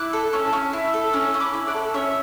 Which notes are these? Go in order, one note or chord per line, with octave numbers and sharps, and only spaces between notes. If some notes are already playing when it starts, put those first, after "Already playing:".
Already playing: E4 D6 F#6
A4
C#4
C#4
E4
A4
C#4
C#4
B5 D6
E4
D5 F#5
A4
C#4 C#5 E5